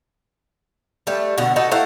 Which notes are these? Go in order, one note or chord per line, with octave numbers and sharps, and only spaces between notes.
G3 A3 B4
B2 D3 F#5
D#4 F#4 A4 B4
A3 E4 F5 F#5